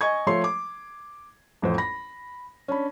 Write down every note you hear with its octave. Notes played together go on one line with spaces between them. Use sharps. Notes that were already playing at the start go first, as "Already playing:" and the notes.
D#5 G#5 C#6 G#6
F3 A3 C#5 C6 C7
D6
A1 F2 C5
B5 A#6
C#4 D4 B5